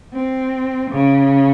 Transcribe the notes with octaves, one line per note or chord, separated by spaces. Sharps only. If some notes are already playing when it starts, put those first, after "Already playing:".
C4
C#3